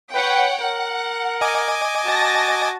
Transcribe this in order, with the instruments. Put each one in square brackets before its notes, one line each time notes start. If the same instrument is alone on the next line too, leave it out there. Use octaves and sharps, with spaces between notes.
[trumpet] B4 [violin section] C#5 F#5 G5
[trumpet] A#4 [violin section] F#5
[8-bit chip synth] D#5 G#5 D6
[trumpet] F#4 [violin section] A5 A6 A#6